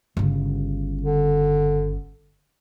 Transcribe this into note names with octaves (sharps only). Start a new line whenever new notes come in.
G1 C#3
D3